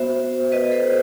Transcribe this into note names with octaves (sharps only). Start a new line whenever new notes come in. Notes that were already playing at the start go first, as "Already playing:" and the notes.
Already playing: B3 F#4 C5 E5
B4 D#5
A4 C5